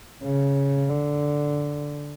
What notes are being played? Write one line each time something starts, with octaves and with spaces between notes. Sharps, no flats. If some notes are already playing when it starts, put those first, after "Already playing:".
C#3
D3